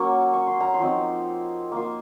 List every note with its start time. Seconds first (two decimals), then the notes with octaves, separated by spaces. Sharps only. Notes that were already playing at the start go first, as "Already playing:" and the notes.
Already playing: F#3 A#3 C#4 C#6
0.33 C#6
0.47 C6
0.60 A#5
0.74 C6
0.80 F3 C4 D#4
1.72 A#3 F4